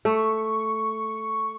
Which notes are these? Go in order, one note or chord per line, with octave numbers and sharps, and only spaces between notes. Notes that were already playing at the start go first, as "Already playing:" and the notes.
A3 C#6